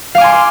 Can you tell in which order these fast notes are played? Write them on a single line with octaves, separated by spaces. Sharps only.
F5 D6 G#5 C6